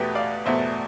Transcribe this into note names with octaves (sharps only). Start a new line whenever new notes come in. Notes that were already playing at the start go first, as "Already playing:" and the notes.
Already playing: E2 B2 A3 G4 B4
D5 F5
E2 B2 A3 C5 E5